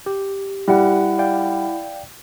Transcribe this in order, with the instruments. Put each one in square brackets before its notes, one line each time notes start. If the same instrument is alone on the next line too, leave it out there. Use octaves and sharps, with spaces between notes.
[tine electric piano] G4
[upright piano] G3 [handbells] E4 F#5
[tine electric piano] D5 F5 G5